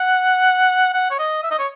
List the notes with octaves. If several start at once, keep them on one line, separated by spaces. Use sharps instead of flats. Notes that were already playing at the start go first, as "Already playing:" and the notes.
Already playing: F#5
F#5
C#5
D#5
E5
D#5
C#5